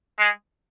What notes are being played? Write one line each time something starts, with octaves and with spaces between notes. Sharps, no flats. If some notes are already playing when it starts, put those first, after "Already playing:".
G#3